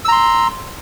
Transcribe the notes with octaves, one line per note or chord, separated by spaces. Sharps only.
A#5 C6 E6